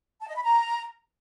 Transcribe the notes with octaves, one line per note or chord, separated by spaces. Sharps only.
A5
D#5
B5
A#5